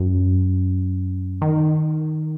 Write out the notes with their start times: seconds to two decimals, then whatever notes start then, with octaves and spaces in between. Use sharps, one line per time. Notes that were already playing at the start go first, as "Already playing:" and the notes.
Already playing: F#2
1.42 D#3